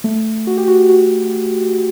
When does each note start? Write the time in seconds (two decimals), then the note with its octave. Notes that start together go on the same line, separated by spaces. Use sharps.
0.04 A3
0.47 F#4
0.57 G4
0.68 F#4
0.89 F#4